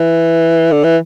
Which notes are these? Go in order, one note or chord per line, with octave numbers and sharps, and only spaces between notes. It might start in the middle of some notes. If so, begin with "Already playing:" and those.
Already playing: E3
D3
E3